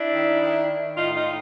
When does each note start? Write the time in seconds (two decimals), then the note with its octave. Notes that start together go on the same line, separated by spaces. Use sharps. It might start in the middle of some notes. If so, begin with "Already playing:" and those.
Already playing: D4 E4
0.12 D#3
0.40 D#3
0.68 D#3
0.96 A2 D#4 F4
1.15 D#4 F4
1.24 A2